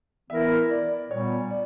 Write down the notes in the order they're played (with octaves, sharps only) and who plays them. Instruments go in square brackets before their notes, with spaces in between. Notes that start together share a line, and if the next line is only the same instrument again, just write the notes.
[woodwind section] E3 B3 E4 A#4 [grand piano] E5
[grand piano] D5
[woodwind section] A#2 G3 B3 [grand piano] C#5
[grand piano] D5